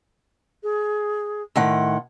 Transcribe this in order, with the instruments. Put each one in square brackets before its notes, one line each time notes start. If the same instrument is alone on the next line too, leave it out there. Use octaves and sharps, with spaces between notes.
[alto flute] G#4
[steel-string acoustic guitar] A2 D#3 F#5 [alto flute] C6